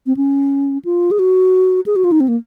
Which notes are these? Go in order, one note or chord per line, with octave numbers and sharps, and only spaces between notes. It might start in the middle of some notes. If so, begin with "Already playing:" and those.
C4
C#4
F4
G#4
F#4
G#4
F#4
F4
D#4
C4
A#3